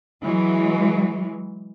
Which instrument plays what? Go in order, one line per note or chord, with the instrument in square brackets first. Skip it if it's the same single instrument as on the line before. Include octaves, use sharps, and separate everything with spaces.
[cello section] E3 F#3 G#3